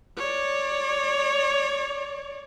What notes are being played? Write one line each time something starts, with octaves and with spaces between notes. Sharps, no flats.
C#5 D5